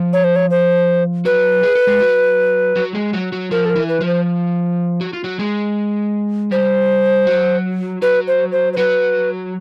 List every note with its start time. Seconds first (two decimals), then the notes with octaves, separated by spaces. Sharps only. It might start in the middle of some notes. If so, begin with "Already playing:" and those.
Already playing: F3 F4
0.13 C#5
0.24 C5
0.36 C#5
0.51 C5
1.25 F#3 F#4 B4
1.63 G#4
1.75 A4
1.87 G#3 G#4
2.00 F#3 F#4
2.76 F#3 F#4
2.94 G#3 G#4
3.13 F#3 F#4
3.32 F#3 F#4
3.51 F3 F4 A#4
3.65 A4
3.70 A#4
3.76 E3 E4
3.89 B4
4.01 F3 F4
4.07 C5
5.01 F#4
5.13 F4
5.24 F#3 F#4
5.39 G#3 G#4
6.51 G3 G4 C5
7.27 F#3 F#4
8.02 F#3 F#4 B4
8.27 C5
8.52 C5
8.73 C5
8.77 F#3 F#4 B4